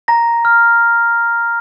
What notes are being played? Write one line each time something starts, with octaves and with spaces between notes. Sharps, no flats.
A#5 A#6
F6